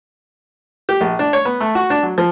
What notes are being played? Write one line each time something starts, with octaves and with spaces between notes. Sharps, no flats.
G4
A#1
D4
C#5
B3
A3
F#4
D4
F#3
F3